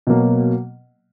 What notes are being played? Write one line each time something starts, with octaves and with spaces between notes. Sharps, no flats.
B2 F#3 A#3